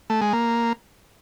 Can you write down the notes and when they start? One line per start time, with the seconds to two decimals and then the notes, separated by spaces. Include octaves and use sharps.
0.10 A3
0.21 G#3
0.33 A#3